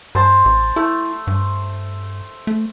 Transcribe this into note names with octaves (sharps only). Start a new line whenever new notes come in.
G2 C5 A5 C6
A1
A3 E4
G2
A3